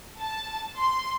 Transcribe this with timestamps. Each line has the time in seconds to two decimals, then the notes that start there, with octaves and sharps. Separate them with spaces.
0.20 A5
0.76 C6